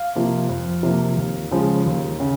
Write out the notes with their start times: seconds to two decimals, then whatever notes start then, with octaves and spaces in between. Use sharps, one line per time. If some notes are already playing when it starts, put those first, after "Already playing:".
Already playing: F5
0.16 C3 F3 A#3
0.49 F2
0.83 C3 F3 A#3
1.17 D#2
1.51 C#3 F3 G#3
1.86 D#2
2.20 C#3